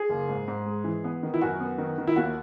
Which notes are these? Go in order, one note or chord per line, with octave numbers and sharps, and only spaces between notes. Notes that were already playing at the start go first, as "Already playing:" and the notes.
Already playing: G#4
F#1
G#2
G#2
G#3
E3
B3
D#3
E4
F#2 F#4
B3
D#3
D#3
E4
D#2 F#4